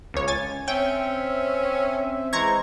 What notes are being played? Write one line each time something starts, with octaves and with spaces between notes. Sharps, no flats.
C#2 C#5
G#5 A6
C4 C#4 E5 G5
E3 G#3 C5 A#5 C#6 G#6